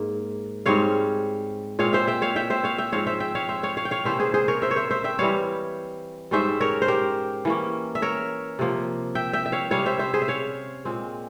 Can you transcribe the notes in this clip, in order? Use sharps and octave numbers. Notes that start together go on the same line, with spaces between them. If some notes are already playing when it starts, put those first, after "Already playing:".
Already playing: G#2 A#3
G#2 G3 C4 C#5 F5
A#2 G#3 C4 C#5 F5
C5 E5
E5 G5
C#5 F5
E5 G5
C5 E5
C#5 F5
E5 G5
G#2 F3 C4 C#5 F5
C5 E5
E5 G5
C#5 F5
C5 E5
C#5 F5
C#5 F5
G5
C#5 F5
C3 E3 A#3 C#4 C5 E5
G#4 C5
G#4 C5
A#4 C#5
C5 E5
C#5
C5 E5
C5 E5
E5 G5
E3 G3 C4 C#5 F5
G#2 G3 C#4 C5 E5
A#4 C#5
C5
G4 A#4
E3 A#3 C#4
E5
A#4 C#5
C3 F3 A#3
E5 G5
E5 G5
E5
C#5 F5
C3 G3 C#4 C#5 F5
C5 E5
C5 E5
G#4 C5
E5
C#5 F5
A#2 G#3 C4